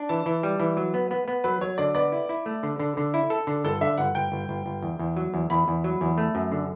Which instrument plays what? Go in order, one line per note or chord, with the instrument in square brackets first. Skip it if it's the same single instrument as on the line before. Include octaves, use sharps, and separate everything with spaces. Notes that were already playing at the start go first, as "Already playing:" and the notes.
Already playing: [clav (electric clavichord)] D4
[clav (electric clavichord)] E3 [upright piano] A5
[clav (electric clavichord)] E3
G3
E3
F#3
B3
B3
B3
[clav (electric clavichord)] F#3 [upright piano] B4
[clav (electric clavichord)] F#3 [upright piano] C#5
[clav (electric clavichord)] D3 [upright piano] D5
[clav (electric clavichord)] B3 [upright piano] D5
[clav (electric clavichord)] E4
E4
A3
D3
D3
D3
E4
A4
D3
[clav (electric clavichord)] G1 [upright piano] A4
[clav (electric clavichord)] D3 [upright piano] E5
[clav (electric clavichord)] G1 [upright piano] F#5
[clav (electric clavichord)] G1 [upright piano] G5
[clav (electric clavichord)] G1
G1
G1
E2
E2
F#3
E2
[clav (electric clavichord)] E2 [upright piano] B5
[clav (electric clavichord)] E2
F#3
E2
A3
F#2
D3